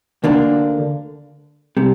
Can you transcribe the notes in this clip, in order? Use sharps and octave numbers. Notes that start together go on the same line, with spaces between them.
D2 D3 A#3 D4
C3 G3